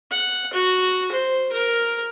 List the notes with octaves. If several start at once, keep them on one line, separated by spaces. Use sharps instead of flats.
F#5
F#4
C5
A#4